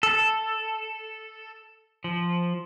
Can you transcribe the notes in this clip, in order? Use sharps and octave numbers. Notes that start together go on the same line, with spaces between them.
A4
F3